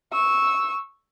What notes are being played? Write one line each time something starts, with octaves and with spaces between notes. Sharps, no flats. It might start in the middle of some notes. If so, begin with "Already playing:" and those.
C#6 E6